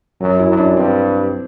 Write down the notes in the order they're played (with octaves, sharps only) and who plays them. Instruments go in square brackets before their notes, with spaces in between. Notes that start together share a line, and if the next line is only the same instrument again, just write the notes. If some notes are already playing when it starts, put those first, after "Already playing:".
[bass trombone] F#2 [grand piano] F#3
[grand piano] E4
[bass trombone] F#2
[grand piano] D4
[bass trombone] G2 [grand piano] C4